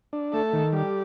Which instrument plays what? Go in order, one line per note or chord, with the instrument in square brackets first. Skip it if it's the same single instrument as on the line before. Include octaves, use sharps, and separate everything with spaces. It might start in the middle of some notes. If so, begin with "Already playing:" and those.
[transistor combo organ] D4
[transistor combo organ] A3 [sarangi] A4
[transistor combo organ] D#3
[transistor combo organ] G3 [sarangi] G4